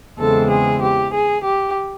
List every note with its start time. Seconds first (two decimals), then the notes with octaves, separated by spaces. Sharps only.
0.19 E2 C#3 E3 G#3 C4 A4
0.50 G#4
0.82 G4
1.14 G#4
1.45 G4